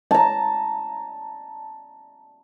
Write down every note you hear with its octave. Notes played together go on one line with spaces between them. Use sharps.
A5 A#5